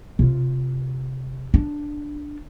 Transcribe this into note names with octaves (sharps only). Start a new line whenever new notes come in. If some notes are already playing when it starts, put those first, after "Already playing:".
C3 F4
D4